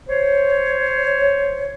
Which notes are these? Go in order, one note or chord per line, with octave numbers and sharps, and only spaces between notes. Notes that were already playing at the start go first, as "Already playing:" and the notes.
C5 C#5